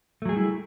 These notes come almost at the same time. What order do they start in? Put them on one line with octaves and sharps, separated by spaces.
A3 F#3 G#4 G3 E4